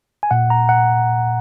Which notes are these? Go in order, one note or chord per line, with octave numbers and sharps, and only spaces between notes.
G#5
A#2 F#5
A#5
F#5